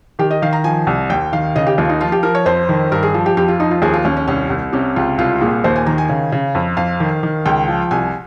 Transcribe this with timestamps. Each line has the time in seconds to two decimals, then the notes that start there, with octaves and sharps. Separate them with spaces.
0.19 D#3 G4
0.31 D#5
0.42 D#3 F5
0.53 A#5
0.64 F3 G#5
0.87 C2
1.10 D#2 G5
1.33 D#3 F5
1.56 C#3 D#5
1.67 G4
1.78 D#2 F4
1.89 D#4
2.01 F3 F4
2.12 G4
2.23 F3 A#4
2.35 C#5
2.46 F2 C5
2.69 D#3
2.91 G2 A#4
3.03 G#4
3.14 F3
3.26 G4
3.37 F2 G4
3.48 F4
3.60 F3 D#4
3.71 F4
3.82 D#2 G#4
3.93 F4
4.05 D#2 C#4
4.17 C#4
4.27 C2 C#4
4.50 C2
4.73 C3 C#4
4.96 C#2 F4
5.18 C2 F4
5.41 A#2 G#4
5.64 D#2 C5
5.76 G#5
5.86 D#3 A#5
5.98 G#5
6.09 C#3
6.32 C#3
6.55 F2
6.77 F2 F5
7.00 D#3
7.23 D#3
7.46 C#2 G5
7.68 F3
7.91 C2 G#5